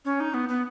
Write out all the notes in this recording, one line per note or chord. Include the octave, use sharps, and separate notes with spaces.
C#4
D#4
B3
B3